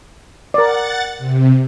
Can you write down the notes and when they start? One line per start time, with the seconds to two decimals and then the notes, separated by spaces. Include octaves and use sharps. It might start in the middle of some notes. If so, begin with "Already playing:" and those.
0.54 A#4 D5 F#5 A6
1.18 C3